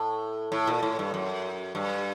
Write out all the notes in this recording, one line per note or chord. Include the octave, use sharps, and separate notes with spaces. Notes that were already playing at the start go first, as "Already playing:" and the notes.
Already playing: A2
A2
A#2
A2
G2
F#2
G2